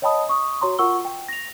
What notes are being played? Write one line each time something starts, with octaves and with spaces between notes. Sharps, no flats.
C#5 D#5 G5 A5 B5 D#6
C#6 D#6
F#4 C#5 A#5 C6
F4 A#4 F#5 C#6 E6 G7
G5
A#6 F7